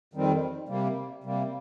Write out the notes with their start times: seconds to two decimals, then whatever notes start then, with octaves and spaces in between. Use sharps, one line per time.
0.13 F2 D#3 G3 C4
0.68 C3 G3 A#3
1.24 C3 G3 A#3